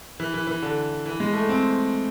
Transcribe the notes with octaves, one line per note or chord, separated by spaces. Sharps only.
E3
E3
E3
D3
E3
G#3
A3
C4